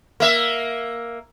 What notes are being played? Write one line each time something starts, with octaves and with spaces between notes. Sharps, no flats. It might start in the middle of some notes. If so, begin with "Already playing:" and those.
A#3 E5